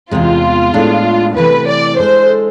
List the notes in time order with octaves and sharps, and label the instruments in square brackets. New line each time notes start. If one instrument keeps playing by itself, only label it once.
[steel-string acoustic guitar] E2 C3 G#3 [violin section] F4
[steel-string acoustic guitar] A2 G#3 D4
[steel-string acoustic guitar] C3 E3 A3 [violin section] B4
[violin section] D5
[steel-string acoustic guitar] G#3 D4 A4 [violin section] C5